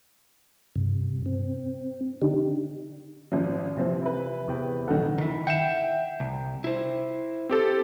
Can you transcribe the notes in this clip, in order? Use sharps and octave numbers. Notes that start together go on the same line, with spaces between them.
G2 C3
C4
D3 D4 D#4 G4
G#1 F3
C3 E3 F3 C4
E4 B4
E2 C3 G5
A#1 D#3 F#3 A4 F#5
D#3 E4
E5 F#5 G5 E7
C2
E4 C5
C4 G4 A4